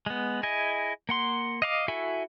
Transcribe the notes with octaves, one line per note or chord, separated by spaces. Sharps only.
G#3 B3
E4 G#4 D#5 G#5
A#3 F#5 C6
D#5 F5 D6
E4 F#4 A4 E5 G#5